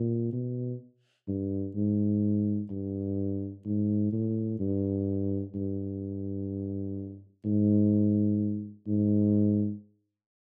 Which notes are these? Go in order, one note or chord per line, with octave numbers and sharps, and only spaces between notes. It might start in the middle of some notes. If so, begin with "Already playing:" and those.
Already playing: A#2
B2
G2
G#2
G2
G#2
A2
G2
G2
G#2
G#2